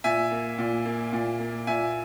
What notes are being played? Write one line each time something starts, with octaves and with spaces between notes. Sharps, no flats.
A#2 E5 G#5
A#3
A#2
A#3
A#2
A#3
A#2 E5 G#5